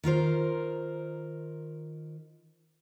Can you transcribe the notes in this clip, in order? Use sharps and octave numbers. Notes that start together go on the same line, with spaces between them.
D#3 F4 A#4 C5